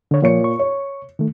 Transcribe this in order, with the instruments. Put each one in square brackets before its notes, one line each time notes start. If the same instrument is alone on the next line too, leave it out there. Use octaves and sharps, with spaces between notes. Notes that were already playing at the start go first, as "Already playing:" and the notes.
[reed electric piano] D3 C#5
[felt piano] A#2 C#5 C#7 [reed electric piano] F3
[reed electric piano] C#6
[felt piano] C#5
[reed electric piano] D#3 A3